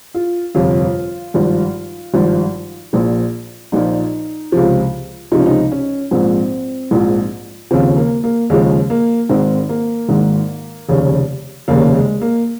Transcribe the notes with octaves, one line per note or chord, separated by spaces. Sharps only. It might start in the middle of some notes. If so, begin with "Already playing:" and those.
F4
G1 F2 C3 F3 F4
G#1 G2 F3
G#1 G2 F3
A#1 A#2 F3
A#1 A#2 F3 D#4
C#2 C3 F3
C#2 C3 F3 D#4
C#4
D#4
C#4
A#1 G#2 F3 C4
A#1 G#2 F3
D#2 C#3 F3 C4
A#3
A#3
D#2 C#3 F3 G#3
A#3
G#1 G#2 D#3 C4
A#3
G#1 G#2 D#3
F1 D#2 C#3
F1 D#2 C#3 A#3
G#3
A#3